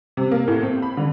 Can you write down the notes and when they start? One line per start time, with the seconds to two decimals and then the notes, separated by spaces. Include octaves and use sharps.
0.17 C3
0.31 A#3
0.48 A2
0.62 C4
0.82 B5
0.97 D3